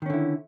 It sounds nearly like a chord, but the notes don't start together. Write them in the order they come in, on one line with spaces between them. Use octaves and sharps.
D#3 C#4 D3 E4